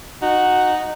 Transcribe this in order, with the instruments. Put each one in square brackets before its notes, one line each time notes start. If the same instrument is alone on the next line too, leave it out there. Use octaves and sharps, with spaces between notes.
[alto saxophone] D#4 [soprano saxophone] F#4